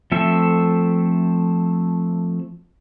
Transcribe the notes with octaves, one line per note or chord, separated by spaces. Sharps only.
F3 A3 C4 A4 E5